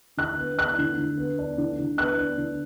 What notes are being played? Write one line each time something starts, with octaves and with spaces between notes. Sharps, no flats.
D3 F#6
B3
D4 F#6
D3
D3
B3
D4
D3
D3
B3 F#6
D4
D3